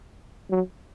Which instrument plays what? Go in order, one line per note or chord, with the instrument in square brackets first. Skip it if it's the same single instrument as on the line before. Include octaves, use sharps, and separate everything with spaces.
[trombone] F#3